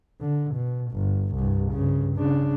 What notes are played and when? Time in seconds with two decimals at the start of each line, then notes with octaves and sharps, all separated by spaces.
0.21 D3
0.55 B2
0.92 G1
1.35 C2 G2
1.72 G2 C#3
2.16 C#3 D4